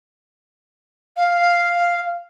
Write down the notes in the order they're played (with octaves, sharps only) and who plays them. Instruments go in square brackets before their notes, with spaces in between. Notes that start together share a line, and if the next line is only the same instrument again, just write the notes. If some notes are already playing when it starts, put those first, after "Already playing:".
[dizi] F5